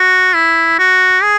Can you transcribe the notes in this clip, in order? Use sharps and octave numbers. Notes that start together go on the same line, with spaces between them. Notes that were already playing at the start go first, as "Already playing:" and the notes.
Already playing: F#4
E4
F#4
G#4